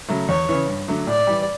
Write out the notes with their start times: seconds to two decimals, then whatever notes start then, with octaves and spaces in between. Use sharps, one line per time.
0.09 C#3 F#3 A3
0.29 E2 C#5
0.49 C#3 E3
0.68 G2
0.88 D3 F#3 A3
1.07 A2 D5
1.27 E3 G3